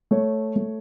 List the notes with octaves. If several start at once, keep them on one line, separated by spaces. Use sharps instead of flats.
A3 C#5
A3